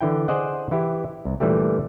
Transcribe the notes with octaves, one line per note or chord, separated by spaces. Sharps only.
D3 E3 E4 G5
G#4 C5 D5 D#5 F#5
E3 E4 G4
C2
A#2 D3 E3 G3 A3 G4